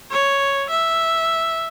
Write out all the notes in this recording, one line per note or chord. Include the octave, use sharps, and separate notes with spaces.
C#5
E5